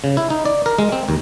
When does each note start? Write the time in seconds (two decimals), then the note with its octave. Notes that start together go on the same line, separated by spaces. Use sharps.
0.04 C#3
0.17 E4
0.30 D#4
0.45 D5
0.66 A#4
0.79 G#3
0.92 C4
1.09 D#2